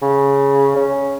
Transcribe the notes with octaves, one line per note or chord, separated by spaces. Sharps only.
C#3
C#4